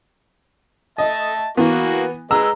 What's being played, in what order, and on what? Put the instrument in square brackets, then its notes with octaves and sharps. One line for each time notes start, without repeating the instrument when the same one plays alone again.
[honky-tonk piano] D#5 [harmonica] E5 A5
[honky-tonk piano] E3 B3 [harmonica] A#3 F#4
[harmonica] G#3 B4 D#5 [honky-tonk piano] A#5 E6